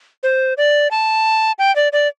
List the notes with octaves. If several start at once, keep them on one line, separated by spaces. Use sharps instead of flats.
C5
D5
A5
G5
D5
D5